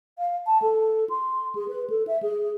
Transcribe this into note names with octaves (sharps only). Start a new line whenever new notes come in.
F5
A5
A4
C6
G#4
B4
A4
E5
G#4